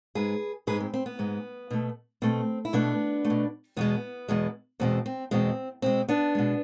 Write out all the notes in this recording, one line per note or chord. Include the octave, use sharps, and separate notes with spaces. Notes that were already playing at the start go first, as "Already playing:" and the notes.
G#2 G#3 G#4 B4
G#2 G#3 G#4 B4
C4
C4
B3
G#2 G#3
B2 A3
B2 A3 C4
E4
B2 A3 B3 D4
A3
B2
E2 B2 G#3 B3
E2 B2 G#3
E2 B2 G#3 C4
C4
E2 B2 G#3 C4
B2 G#3 C4
B3 D4
B2 G#3